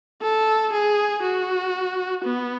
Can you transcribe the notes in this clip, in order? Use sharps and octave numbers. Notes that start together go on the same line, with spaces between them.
A4
G#4
F#4
B3